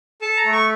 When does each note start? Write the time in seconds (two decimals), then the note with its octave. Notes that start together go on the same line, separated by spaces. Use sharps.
0.22 A4 A5
0.37 A#5
0.45 A3
0.52 C#6